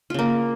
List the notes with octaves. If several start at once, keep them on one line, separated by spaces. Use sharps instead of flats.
C#3 A#3 F4